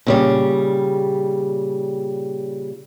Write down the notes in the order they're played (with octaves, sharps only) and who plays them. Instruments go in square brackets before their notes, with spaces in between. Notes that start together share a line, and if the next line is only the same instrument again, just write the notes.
[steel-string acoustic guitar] A#2 C#3 G3